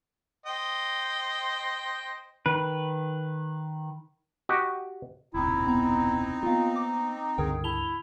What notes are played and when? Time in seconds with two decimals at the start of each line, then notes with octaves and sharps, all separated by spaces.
0.46 C5 D#5 G5
2.46 D#3 B4
4.49 F#4 G4 D#5
5.34 E1 C#2 A#2 C4 D#4 E4
5.67 B3 A#5
6.43 A#3 B3 F4 F5
6.76 D6
7.38 C#2 G2 D3 G#4 A#4 G5
7.64 E4 A5 F7 G7